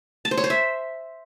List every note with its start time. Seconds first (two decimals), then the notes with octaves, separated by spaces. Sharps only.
0.25 A5
0.31 C5
0.37 C#5
0.44 C5
0.50 E5